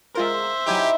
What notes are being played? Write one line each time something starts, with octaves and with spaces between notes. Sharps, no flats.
G#3 F4 A#4 C5 E5
F#3 D#4 E4 G4 D#5 G#5 G6